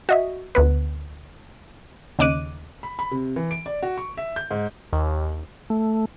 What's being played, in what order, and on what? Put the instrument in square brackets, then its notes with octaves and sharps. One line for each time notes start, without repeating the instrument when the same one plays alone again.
[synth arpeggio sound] F#4 D#5 E5
D2 B3 B4
D#2 C#3 D#5 D6 F#6 D#7
[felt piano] B5
B5
C3
E3
D7
D5
F#4
C#6
E5
G6
G#2
[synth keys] D#2
[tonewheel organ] A3